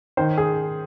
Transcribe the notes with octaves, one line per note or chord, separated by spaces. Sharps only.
D#3 C5
G#4